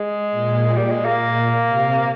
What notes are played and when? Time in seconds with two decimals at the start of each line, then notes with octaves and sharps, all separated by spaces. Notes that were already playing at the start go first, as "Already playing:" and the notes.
Already playing: G#3
0.31 A#2
0.76 G3
0.90 G#3
1.05 A#3
1.20 A#2
1.65 C3